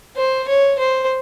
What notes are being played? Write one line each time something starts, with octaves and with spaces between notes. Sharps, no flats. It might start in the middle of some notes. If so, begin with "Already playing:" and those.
C5
C#5
C5